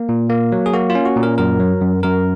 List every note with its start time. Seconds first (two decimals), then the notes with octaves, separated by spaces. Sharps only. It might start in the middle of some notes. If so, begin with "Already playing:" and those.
Already playing: A#3
0.09 A#2
0.30 A#3
0.52 F#3
0.66 G#4
0.74 A#3 F#4
0.90 F4
0.95 C#4
1.05 F#4
1.16 A#2
1.23 A#4
1.38 F#2 A#4
1.60 F#3
1.82 F#2
2.03 F#2 A#4